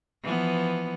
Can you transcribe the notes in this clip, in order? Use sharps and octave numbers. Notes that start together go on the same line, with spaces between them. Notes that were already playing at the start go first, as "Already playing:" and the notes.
E3 F3 B3